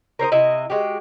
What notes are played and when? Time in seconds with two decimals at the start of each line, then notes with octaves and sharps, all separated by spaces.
0.19 A#4 C5 C#5 D#5
0.32 C3 E4 D#5
0.70 G#3 F#4 G4